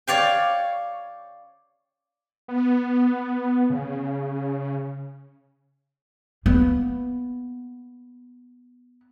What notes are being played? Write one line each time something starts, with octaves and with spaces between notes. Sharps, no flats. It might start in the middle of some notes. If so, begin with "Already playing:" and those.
C#5 D5 F5 G5
B3
C#3
A#3 B3